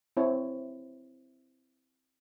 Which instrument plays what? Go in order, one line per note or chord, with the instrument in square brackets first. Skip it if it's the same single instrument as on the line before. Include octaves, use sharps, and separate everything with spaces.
[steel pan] C4 E4 C#5